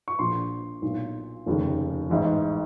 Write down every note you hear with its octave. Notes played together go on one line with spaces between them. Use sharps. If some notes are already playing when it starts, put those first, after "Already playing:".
C#6
A#1 A#2 C6
B1 A#2
F1 D#2 C#3
A1 G#2 E3